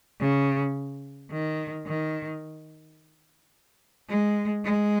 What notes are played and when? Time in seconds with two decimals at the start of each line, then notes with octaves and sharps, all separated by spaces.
0.20 C#3
1.32 D#3
1.87 D#3
4.09 G#3
4.65 G#3